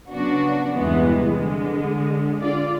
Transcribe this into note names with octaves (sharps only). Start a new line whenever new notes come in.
C#3 F#3 B3 D4 F#4
E2 G2 C3 E3 G#3 B3
D3 G#3
D3 F4 D5